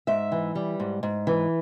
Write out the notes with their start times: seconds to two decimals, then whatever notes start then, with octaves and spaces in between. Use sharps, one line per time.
0.07 G#2 E5
0.32 E3
0.55 G3
0.80 G#2
1.03 G#2
1.27 E3